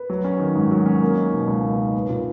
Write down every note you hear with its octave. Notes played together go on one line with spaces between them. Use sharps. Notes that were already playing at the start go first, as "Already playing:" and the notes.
Already playing: B4
F#3
C#4
D#3
G#2
F#3
C#4
A#3
D#4
B2
C#2
A#3
D#4
B3
A#2